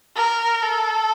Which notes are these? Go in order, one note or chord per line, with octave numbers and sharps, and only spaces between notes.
A#4
A4